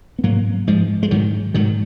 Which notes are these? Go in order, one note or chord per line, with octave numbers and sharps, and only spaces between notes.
B3
G#2 F#3 A#3
G#2 F3 G#3
G#3
G#2 D#3 F#3
G#2 D#3 F#3